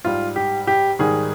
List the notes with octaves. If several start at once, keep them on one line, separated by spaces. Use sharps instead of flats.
G#2 G3 F4
G4
G4
G#2 D#3 G3 G#4